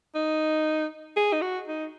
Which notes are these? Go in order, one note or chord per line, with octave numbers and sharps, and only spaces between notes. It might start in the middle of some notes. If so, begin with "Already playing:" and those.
D#4
G#4
D#4
F#4
D#4